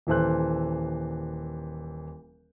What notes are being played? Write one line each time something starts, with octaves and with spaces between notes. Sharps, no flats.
D#1 E3 A4 C5 F#6